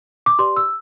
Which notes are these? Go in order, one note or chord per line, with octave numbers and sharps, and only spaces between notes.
D6
G4 B4 D5 C6
E6